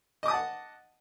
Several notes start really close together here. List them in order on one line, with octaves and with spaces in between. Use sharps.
D#5 D6 D#6 A5 F#5